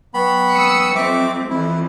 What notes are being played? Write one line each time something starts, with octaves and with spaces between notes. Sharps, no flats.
F#3 B3 G5 B5 C#6
D#6 E6 C#7
F2 C4 E5 D6
F2 E3 E4